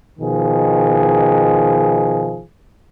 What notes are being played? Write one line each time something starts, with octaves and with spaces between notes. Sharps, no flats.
B2 D#3 F3 G#4